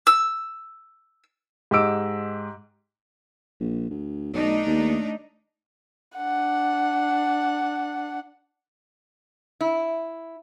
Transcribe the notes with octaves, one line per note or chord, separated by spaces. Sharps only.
E6
G#2 G4 D#5 D6 E6 D7
A#1
D2
B1 A3 D4 D#4
D#2
D4 F#5
E4